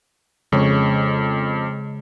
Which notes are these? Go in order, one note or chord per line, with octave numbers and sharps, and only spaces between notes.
F2 C#3 G#3 C#5